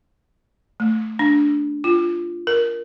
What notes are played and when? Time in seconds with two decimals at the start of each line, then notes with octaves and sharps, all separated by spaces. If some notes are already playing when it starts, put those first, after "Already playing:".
0.80 A3
1.19 D4
1.84 F4
2.47 A#4